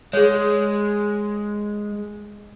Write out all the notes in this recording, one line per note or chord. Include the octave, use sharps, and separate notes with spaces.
G#3 G#4 C#5